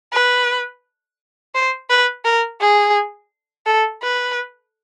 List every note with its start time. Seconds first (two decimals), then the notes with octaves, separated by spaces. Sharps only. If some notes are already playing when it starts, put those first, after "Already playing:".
0.13 B4
1.54 C5
1.90 B4
2.25 A#4
2.61 G#4
3.66 A4
4.02 B4